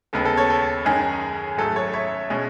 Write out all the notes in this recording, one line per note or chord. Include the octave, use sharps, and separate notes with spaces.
D#2 C#3 G#3 B3 A4
A4
A4 C#5
A4
F#2 D#3 G#3 C#4 G#4
G#2 F#3 A3 A4
A4 C#5
C#5 E5
B2 G#3 C#4